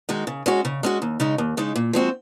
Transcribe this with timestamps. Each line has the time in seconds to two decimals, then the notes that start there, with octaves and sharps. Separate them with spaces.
0.09 D#3 G#3 D#4 F#4
0.27 C#3
0.46 G#3 C#4 F#4
0.65 C#3
0.83 G#3 C#4 F#4
1.02 D#2
1.20 C#3 G#3 D#4
1.38 D#2
1.57 C#3 G#3 D#4
1.76 A#2
1.93 F3 G#3 C4 F#4